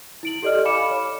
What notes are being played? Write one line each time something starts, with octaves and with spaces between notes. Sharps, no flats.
E4 D7 F#7
G4 A4 D5 D#5 F6
F5 G#5 B5 D6 C#7 E7
C#5